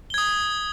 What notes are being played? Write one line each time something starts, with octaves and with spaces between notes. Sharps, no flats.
D#6 G#6 G7